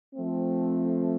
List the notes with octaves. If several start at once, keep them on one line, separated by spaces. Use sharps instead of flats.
F3 A3 C4